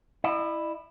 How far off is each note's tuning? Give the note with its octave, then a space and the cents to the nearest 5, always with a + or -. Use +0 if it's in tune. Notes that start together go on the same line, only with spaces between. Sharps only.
E4 +0 D#5 -45